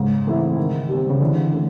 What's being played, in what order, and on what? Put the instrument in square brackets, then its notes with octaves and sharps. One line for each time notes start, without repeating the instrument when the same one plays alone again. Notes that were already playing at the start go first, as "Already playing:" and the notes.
Already playing: [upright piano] G#2 [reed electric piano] C#3
[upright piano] E3 A3 C4 E4
D#3
G3 C4
[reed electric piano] C#3
[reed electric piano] D3 [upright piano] E3
[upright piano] A3 C#4